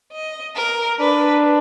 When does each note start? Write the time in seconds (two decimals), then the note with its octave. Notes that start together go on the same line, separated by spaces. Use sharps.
0.12 D#5
0.56 A#4
0.99 D4 B4